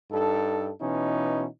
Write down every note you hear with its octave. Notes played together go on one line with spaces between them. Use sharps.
G2 D#4 A4
B2 E3 C#4 D#4